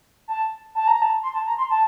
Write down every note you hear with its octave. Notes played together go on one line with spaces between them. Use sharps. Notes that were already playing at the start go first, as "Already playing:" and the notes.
A5
A5
A#5
A5
C6
A5
A#5
C6
A5